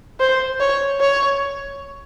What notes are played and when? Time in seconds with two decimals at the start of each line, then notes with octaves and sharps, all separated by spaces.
0.20 C5
0.60 C#5
1.00 C#5